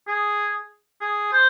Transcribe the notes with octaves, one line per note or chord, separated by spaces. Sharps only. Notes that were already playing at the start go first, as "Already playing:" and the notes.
G#4
G#4
C5